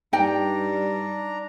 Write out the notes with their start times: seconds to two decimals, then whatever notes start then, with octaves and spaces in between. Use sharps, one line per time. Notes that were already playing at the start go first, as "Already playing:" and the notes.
0.13 G2 G3 D4 D#4 G5 A#5